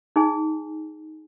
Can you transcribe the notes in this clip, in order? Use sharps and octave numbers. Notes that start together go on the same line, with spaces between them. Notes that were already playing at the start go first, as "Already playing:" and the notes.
D#4 G#4 G#5